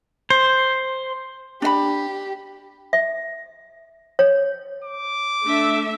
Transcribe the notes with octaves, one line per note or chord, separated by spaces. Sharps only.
C5
D4 G4 D#5 B5
E5
C#5
D6
A3 D4 E5